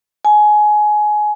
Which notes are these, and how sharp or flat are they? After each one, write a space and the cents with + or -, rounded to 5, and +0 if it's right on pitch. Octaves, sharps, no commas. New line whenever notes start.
G#5 +20